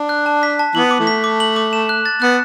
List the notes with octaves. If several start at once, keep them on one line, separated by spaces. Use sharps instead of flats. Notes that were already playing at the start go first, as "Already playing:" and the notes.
Already playing: D4
F#6
A5
B6
A5
E3 B3 F#7
D6
E3 A3
B6
D6
F#7
D6
E7
F#6
A6
B3 F#6